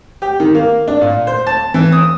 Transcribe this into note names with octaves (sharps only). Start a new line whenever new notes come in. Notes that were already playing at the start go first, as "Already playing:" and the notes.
G4
D#3
A#3
D4
A#2
C5
A5
E3
D#6